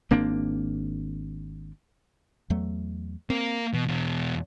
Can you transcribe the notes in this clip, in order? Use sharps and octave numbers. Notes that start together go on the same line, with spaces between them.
G#1 A#3 C4 D4
E2 F#3 A3
A#3 C4 A#4
B2 E3
E2 B2